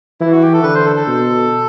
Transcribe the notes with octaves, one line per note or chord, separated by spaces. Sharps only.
E3 E4
F#4
G4
A4
D3 B4
C5
A4
A4
B2